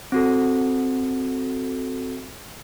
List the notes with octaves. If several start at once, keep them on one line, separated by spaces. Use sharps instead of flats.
C4 F#4 A4